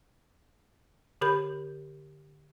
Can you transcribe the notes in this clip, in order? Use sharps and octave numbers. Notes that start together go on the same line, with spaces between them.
D3 G4 A#4 B5 G6